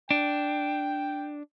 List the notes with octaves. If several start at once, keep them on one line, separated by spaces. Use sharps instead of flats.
D4 G5